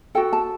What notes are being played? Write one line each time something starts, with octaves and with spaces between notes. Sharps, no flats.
F#4 A4 G5
A5